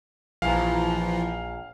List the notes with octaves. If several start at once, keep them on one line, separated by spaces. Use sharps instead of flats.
A#1 E3 F3 F5 G#5 A#5